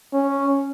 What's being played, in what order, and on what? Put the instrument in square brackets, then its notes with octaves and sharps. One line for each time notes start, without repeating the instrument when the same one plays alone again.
[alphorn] C#4